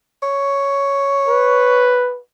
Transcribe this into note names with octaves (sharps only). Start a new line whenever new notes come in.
C#5
B4